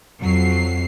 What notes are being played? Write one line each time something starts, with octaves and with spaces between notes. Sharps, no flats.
F2 F#3 C7